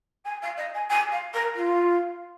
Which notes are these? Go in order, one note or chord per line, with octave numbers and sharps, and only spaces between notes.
G#5
F5
D#5
G#5
G#5
F5
A#4
F4